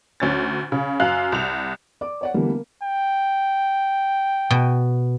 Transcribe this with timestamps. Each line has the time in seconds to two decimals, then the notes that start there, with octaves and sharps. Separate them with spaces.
0.20 D2 C#4 A6
0.72 C#3
1.00 F#2 F5 F#6
1.32 C2 F7
2.01 D5 D6
2.21 C#5 D5 F#5
2.34 D3 E3 G3 A#3 B3
2.49 A#3
2.84 G5
4.51 B2